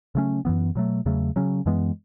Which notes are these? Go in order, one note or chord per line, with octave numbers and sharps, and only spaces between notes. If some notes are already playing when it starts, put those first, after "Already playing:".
C#3 F#3 A3 C#4
F#2 E3 B3
B2 F#3 A3
E2 C#3 F#3 A3
C#3 F#3 C#4
F#2 E3 G#3 B3